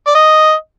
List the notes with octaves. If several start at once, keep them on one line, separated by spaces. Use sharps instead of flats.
D5
D#5